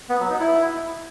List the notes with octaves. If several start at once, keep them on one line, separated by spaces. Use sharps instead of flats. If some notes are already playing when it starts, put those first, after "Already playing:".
B3
F#3
D#4
E4